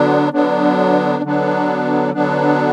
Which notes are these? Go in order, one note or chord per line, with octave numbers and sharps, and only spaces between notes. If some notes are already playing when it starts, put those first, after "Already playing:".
Already playing: D3 F#3 B3 D4
D3 F#3 B3 D4
D3 F#3 B3 D4
D3 F#3 B3 D4